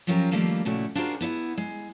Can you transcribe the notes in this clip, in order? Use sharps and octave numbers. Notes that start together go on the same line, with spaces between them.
F3 F#3 C#4 F4 G4 A#4
D#3 F3 G3 A3 A#3 F4
A#2 C#3 A3 E4 F#4
D4 F4 F#4 G#4 A#4 C5
B3 E4 C5 F#5
G#3